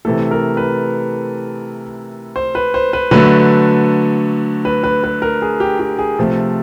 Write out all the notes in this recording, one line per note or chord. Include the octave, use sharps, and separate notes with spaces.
C3 E3 A3 A4
A#4
B4
C5
B4
C5
B4
D3 F#3 A3 B4
B4
B4
B4
A#4
G#4
G4
G4
G#4
C3 F3 A3 A4